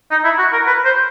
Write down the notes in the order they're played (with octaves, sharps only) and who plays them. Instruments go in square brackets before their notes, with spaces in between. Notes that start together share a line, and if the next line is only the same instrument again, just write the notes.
[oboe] D#4
E4
F#4
A#4
B4
C5